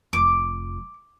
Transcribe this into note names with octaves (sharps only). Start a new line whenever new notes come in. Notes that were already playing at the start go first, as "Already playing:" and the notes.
F1 F2 D6